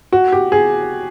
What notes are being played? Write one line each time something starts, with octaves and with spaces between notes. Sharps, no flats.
F#4
G4
G#4